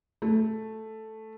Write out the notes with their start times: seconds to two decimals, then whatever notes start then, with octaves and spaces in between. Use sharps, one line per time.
0.22 A3